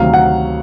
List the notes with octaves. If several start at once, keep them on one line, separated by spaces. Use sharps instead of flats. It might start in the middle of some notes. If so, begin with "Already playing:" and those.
Already playing: D2 C3 D#3 F#3 F5
F#5